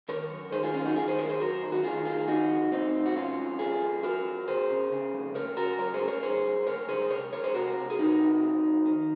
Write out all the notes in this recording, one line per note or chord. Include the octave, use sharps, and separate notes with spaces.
D#3 A#4 C#5
F#2
D#3 G#4 C5
F4 G#4
F#2 C#4 F4
D#4 F#4
D#3 F4 G#4
G#4 C5
F#2 A#4 C#5
G#4 C5
F#2 F#4 A#4
D#3
F#4
D#3 F4 G#4
D#3 F4 G#4
F2 D#4 F#4
F2
F2 C4 D#4
C3
F#4
F2 C#4 F4
F2
F2 F4 G#4
F2
F2 F#4 A#4
F2
C#3 G#4 C5
C#3
C#3
F2
C#3 A#4 C#5
C#3 F#4 A#4
F#2 A#4 C#5
G#4 C5
C#3
A#4 C#5
F#2 G#4 C5
F#2
C#3 A#4 C#5
F#2 G#4 C5
C3 A#4 C#5
F2 A#4 C#5
G#4 C5
C3 F#4 A#4
C3
G#4
C3 D#4 F#4
C3
F2
F2
D#3